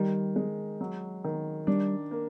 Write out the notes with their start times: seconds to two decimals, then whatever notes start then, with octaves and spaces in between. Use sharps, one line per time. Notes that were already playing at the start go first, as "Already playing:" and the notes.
Already playing: D#3 G3
0.36 G#3
0.81 F#3
1.24 D#3
1.67 G3 D4
2.11 A#3